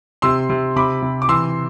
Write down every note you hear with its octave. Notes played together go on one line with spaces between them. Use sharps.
C3 C6 E6
C3
C3 B5 D6
C3
D6
E3 C6 E6